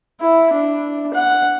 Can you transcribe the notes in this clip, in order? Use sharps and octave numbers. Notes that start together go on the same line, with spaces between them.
E4
D4
F#5